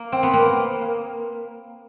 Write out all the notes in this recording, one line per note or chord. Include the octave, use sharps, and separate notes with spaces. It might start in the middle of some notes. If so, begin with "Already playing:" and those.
Already playing: A#3
C4
B3
A#3